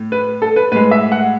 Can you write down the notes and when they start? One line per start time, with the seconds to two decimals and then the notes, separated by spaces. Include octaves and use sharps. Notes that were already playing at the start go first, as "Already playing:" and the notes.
Already playing: A2
0.12 B4
0.42 A4
0.56 B4
0.72 A2 B4
0.76 G#3
0.91 E5
1.12 F#5